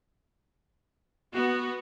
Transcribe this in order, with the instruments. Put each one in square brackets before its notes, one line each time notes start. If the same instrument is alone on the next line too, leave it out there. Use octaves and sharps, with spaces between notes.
[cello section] B3 [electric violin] F#4